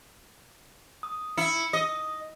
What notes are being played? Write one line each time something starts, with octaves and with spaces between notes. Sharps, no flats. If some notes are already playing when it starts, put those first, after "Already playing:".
D#6
E4 C#7
D#5 D#6